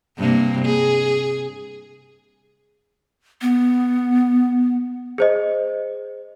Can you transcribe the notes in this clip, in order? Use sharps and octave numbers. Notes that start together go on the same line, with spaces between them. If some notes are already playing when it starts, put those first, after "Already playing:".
G2 C3 A#3
G#4
B3
G#4 C5 D#5